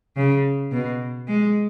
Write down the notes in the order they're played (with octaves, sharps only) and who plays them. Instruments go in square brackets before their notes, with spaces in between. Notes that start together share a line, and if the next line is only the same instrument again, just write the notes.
[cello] C#3
B2
G#3